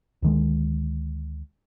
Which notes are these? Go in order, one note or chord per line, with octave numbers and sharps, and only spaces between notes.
D2 D#3 G#3